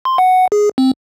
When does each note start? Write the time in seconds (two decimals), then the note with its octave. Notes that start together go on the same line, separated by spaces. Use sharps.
0.05 C6
0.18 F#5
0.52 G#4
0.78 C4